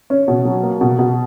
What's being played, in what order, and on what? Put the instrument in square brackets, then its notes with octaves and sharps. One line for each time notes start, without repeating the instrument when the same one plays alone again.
[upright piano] C#4
B2
F#3
A#3
B2
B2